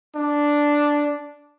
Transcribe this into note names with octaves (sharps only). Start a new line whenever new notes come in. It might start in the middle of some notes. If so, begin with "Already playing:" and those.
D4